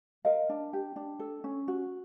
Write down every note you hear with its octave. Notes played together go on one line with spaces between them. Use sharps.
A#4 D#5 F5
D4
G4
D4
A4
C#4
F#4